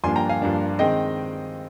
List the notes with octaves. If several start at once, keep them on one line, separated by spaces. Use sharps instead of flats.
G2 F3 A#3 D4 G#5 C6
G5 A#5
F5 G#5
G2 F3 A#3 D4
D#3 G#3 C4 D#5 G5